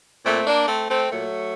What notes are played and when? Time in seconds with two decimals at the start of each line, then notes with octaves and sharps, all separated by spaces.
0.24 A#2 A3 C4
0.47 A#3 D4
0.67 A3 C4
0.89 A3 C4
1.11 A#2 F#3 A3